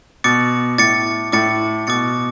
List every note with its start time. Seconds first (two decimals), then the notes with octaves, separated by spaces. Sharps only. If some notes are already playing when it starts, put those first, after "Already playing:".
0.24 B2 D6 A6 C#7
0.78 A2 D6 A6 C#7
1.32 A2 D6 A6 C#7
1.87 B2 D6 A6 C#7